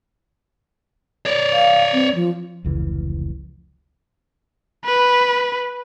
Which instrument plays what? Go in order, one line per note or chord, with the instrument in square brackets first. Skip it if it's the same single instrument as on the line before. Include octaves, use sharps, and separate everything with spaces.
[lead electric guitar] C#5 D5
[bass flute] F5
C4
F3
[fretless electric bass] F1 C#2 E3
[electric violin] B4